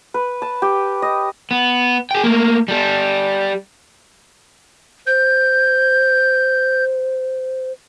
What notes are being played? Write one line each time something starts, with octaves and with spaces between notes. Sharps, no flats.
B4
A5
G4
D#5
B3
G#4 G5
A3 A#3
G3 A4
C5 G6